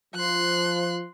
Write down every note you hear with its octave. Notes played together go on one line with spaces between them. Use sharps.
F3 C6 F#6